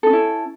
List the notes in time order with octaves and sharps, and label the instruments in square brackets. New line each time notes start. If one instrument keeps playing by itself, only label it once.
[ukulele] A4
D#4
C#4
E4